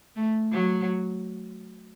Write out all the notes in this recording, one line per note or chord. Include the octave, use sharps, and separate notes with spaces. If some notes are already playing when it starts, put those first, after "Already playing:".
A3
F#3